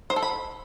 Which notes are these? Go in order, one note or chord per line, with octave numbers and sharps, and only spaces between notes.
C5
A4
B5